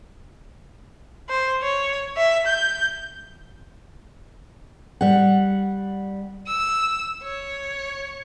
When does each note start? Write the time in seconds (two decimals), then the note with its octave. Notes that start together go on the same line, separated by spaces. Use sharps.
1.29 C5
1.62 C#5
2.17 E5
2.47 G6
5.01 G3 F#5
6.47 E6
7.23 C#5